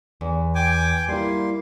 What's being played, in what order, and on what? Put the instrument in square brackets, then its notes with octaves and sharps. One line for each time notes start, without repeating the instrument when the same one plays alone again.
[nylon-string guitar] E2
[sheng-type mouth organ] G5 G#5 D6
[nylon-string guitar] G3 E4 [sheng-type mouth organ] A#3 C6